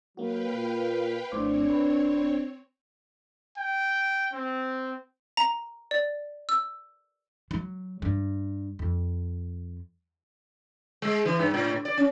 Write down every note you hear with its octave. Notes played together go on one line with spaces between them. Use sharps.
F#3 A#3 F#4 B4 F5 G5
A#2
A#1 A2 C4 D4 C5 C#5 D6
D#1 B4
G5
C4
A#5
D5
E6
F#3
G2
F2
G#3
E3
G2
A2
D5
C#4